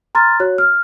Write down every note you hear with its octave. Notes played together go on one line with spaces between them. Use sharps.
A#5 C6 F6 A6
F#4 C#5 F#6
F6